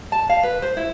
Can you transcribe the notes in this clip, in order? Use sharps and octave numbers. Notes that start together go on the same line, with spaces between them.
A5
F5
B4
C5
E4